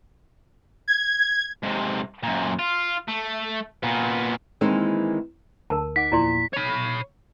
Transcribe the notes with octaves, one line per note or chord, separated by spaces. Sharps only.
G#6
G#2 C3
F#2 A#2
F4
A3
A#2 B3
D#3 E3 G#3 A#3 C4 D#4
D2 A#4 A5
D#4 F#5 D6 B6
E2 A#2 F3 E4 D5 C6
C#5 B5